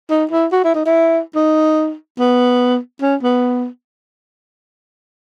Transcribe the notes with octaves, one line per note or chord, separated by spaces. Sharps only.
D#4
E4
F#4
E4
D#4
E4
D#4
B3
C#4
B3